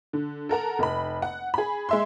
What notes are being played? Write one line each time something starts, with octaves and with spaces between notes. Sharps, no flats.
D3
A4 A#4 F#5 A#5
F1 B5
F#5
G#4 B5
G#3 E5 C6